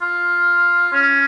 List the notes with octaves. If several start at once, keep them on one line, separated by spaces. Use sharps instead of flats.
F4
C#4